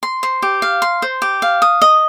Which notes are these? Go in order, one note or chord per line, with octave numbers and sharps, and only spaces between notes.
C6
C5
G4
F5
C6
C5
G4
F5
D#6
D#5